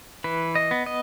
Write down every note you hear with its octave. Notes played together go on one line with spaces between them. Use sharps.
E3 B4
D#5
B3
D#5